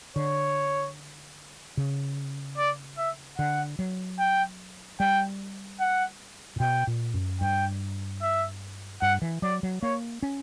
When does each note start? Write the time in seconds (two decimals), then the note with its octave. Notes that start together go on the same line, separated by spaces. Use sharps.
0.16 D3 C#5
1.77 C#3
2.58 D5
2.98 E5
3.38 D3 F#5
3.79 F#3
4.19 G5
5.00 G3 G5
5.80 F#5
6.56 A#2
6.60 B2 G5
6.87 A#2
7.14 F#2
7.41 G2 G5
8.21 E5
9.02 G2 F#5
9.22 E3
9.42 F#3 D5
9.63 F#3
9.83 A#3 C#5
10.23 C#4